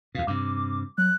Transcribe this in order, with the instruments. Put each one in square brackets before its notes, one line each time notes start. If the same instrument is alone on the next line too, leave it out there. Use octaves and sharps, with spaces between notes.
[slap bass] E2 B2 [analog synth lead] F5
[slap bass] G2 C3 [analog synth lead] D6
[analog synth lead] F#3 [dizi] F#6